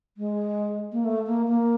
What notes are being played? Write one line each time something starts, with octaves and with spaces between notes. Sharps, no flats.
G#3
A#3
A3
A#3
A#3